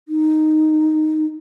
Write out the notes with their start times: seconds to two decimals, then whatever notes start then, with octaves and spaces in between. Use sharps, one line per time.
0.08 D#4